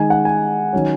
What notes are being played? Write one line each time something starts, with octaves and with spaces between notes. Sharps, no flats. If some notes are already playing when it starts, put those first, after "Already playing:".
Already playing: D#3 G#3 D#4 G#5
F#5
G#5
D#3 F#3 C#4